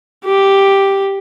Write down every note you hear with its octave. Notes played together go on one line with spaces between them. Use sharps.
G4